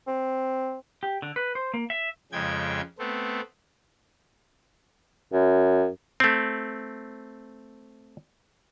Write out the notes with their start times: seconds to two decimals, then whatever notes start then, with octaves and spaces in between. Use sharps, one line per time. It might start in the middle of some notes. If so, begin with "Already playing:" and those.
0.07 C4
1.03 G4
1.22 D3
1.36 B4
1.55 C5
1.74 A#3
1.90 E5
2.32 F2 C#3 G#3 G5 G#6
2.99 A3 B3 C4
5.33 F#2
6.20 A3 C4